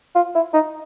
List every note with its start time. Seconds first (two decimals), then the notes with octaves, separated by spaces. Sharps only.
0.15 F4
0.35 E4
0.54 D#4